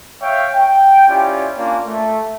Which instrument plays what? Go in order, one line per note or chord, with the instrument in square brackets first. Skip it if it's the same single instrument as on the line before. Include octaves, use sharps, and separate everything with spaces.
[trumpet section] C#5 E5 F5 G5 C#6
G5
C#4 E4 F4 G4 D5
A#3 C#4 D4 F4 D5
A3